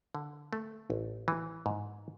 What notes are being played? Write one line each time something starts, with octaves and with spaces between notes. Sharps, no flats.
D3
A3
A1
E3
G#2